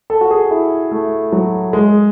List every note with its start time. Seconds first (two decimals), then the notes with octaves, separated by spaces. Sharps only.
0.10 A4
0.21 F#4
0.31 G#4
0.51 E4
0.92 A3
1.32 F#3
1.73 G#3